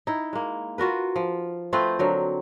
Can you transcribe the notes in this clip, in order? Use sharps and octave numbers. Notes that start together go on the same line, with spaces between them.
D#4 E4
G#3 A#3
F4 F#4 A#4 B4
F3
A3 C4 F4 B4
D3 F#3 A#4